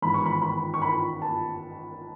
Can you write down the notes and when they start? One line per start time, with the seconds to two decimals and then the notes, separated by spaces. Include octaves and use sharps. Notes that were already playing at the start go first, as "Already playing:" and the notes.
0.02 G#1 G#2 E3 B3 B5
0.14 C#6
0.26 B5
0.42 B5
0.74 C#6
0.82 B5
1.22 A5